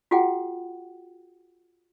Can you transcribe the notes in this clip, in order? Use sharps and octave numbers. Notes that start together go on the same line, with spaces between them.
F4 F#4 G#4 F#5 G5